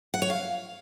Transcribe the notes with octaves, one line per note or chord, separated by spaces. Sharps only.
F#5
C#5
F5